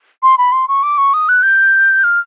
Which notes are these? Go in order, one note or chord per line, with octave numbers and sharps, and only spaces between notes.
C6
B5
C6
C#6
D6
C#6
D#6
F#6
G6
F6